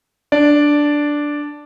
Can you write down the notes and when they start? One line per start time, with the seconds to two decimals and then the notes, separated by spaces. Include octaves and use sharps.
0.32 D4 D5